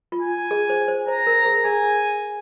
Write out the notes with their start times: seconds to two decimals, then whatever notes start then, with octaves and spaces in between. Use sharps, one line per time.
0.12 F4
0.21 G#5
0.51 G#4
0.70 C5
0.88 C5
1.08 C5 A#5
1.27 A#4
1.46 G#4
1.65 G#4 G#5